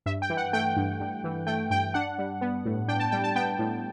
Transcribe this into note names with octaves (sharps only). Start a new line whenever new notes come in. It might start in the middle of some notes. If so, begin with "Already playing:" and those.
G2 E5
G5
E3
F#5
A3 G5
G2
G2
E3
A3 G5
G2 G5
D4 F#5
G3
B3
A2
D4 G5
A5
G3 G5
A5
B3 G5
A2